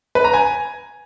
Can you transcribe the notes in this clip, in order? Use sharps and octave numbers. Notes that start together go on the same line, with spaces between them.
B4
A#5
G#5